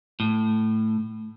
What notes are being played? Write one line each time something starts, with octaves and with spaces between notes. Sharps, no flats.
A2